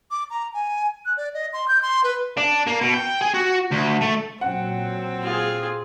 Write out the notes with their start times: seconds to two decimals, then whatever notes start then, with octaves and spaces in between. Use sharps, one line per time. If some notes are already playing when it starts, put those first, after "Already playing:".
0.11 D6
0.30 A#5
0.54 G#5
1.05 F#6
1.17 D5
1.34 D#5
1.53 C6
1.68 G6
1.82 C6
2.04 B4
2.37 D4
2.67 A#3
2.81 B2
2.94 G5
3.22 G#4
3.34 F#4
3.71 D2
4.01 A3
4.41 A#2 F#3 C4 F#5
5.22 F4 G#4